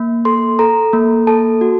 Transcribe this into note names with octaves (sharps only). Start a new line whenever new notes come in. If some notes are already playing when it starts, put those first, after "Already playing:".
Already playing: A#3
A4 C6
A4 A#5
A#3
A4 A5
F#4